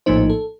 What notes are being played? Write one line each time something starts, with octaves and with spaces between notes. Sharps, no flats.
A#1 A2 F3 A#3 D#4 C5
A4